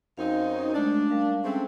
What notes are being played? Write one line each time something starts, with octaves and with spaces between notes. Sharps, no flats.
F#2 C4 D#4 F5
C#4 D#5
G#3 A3 D4
G3 A#4 F5
G#3 A3 C4 C#4 G5